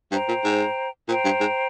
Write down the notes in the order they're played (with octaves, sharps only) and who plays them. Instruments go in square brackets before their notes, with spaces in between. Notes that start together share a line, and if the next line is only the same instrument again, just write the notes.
[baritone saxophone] G2 [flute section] C5 G5 A#5
[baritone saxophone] A#2
G#2
[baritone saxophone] A#2 [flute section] C5 G5 A#5
[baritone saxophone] G2
G#2